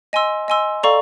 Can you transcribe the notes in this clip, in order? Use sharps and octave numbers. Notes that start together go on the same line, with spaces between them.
D#5 G#5 C6 E6
D#5 G#5 C6 E6
A4 D5 F5 A#5 C#6